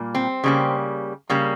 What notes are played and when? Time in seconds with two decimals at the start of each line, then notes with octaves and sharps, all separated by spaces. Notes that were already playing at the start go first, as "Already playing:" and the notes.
Already playing: A#2 G3 A#3
0.15 C4
0.44 C#3 G3 A#3
1.30 C#3 G3 A#3